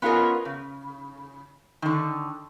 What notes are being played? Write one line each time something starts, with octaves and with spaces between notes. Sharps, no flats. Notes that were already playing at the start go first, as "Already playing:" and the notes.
B3 C#4 F4 G#4 A#4 D#5
C#3
D3 D#3